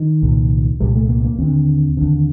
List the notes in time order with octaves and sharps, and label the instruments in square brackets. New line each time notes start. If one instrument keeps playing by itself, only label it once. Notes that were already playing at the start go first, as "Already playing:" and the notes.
Already playing: [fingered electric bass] D#3
C2 A#2
C2 A#2 G3
A3
A#3
A#3
D#2 D3 C4
D#2 D3